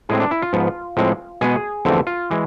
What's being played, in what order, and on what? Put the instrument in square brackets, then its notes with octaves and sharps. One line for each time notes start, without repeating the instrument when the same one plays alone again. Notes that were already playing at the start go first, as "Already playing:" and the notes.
[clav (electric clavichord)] A2 G#3 C4 G#4
D4
E4
F4
G#2 F3 B3
A2 F3 G#3 C4
B2 G#3 B3 G#4
E2 D3 F3 A3 C4
F4
E3 G#3